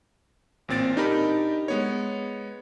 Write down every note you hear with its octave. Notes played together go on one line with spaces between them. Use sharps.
A1 A#2 C4 A6 D7
D4 D#4 G4 A#4 B5
G#3 B3 C#5